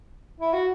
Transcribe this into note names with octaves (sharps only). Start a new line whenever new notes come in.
E4
F#4